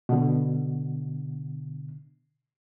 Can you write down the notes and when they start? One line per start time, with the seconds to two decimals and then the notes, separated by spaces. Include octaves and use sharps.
0.09 B2 D3